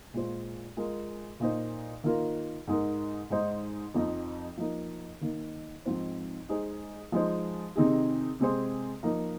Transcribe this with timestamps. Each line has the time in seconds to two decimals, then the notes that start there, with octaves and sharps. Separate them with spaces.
0.13 A#2 G#3 F4 C5
0.77 G#3 F4 A#4
1.40 A#2 A#3 D#4 C5
2.04 D#3 A#3 F4 A#4
2.67 G#2 G#3 D#4 A#4
3.30 G#2 G#3 D#4 C5
3.94 F2 F3 C4 D#4
4.57 F3 A#3 D#4 A#4
5.21 D#3 A#3 D#4
5.85 G#2 F3 C4 D#4 C5
6.49 G#3 D#4 G#4 C5
7.12 F3 G#3 D#4 C5
7.76 C3 D#3 C4 D#4 G#4
8.40 C3 G#3 C4 G#4 C5
9.03 F3 A#3 D#4 A#4